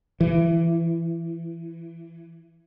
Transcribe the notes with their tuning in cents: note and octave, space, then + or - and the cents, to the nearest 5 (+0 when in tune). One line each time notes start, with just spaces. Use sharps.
E3 +20